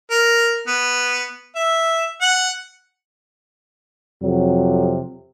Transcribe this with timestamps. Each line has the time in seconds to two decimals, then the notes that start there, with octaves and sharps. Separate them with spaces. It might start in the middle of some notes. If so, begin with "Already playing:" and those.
0.11 A#4
0.67 B3
1.56 E5
2.22 F#5
4.23 F2 C3 F#3